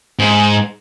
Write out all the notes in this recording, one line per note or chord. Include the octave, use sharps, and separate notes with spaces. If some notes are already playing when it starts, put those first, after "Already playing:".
G#2